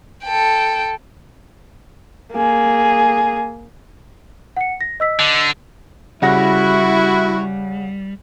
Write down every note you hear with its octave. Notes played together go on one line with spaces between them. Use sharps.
A4 G5
A#3 G#4
F#5 C#7
A#6
D#5 E6 B6
D3
C#3 G3 E4 F#4 F#5 A#6